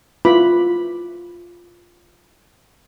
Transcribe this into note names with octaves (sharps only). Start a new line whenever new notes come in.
E4 F4 B4 B5 D6